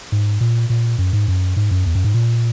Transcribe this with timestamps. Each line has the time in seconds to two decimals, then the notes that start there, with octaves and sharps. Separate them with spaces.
0.12 G#2
0.41 A#2
0.70 A#2
0.98 F#2
1.13 G#2
1.28 F#2
1.56 G#2
1.71 F#2
1.86 E2
1.95 F#2
2.04 G#2
2.14 A#2